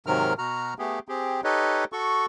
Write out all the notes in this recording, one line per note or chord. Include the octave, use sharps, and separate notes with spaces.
G#2 C3 D#3 F#3 A#4 F6
B2 F#4 A#5 F6
A3 B3 G4 G#4
C4 G4 G#4
D#4 G4 A4 B4 C#5 D#5
F#4 A4 C#6